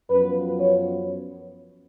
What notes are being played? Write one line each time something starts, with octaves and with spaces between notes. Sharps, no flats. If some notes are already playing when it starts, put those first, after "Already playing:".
F#2 F3 B3 B4
C#5